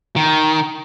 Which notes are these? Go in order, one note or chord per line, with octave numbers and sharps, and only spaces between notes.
D#3